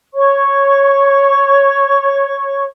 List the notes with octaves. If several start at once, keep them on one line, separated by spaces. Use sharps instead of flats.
C#5 C#6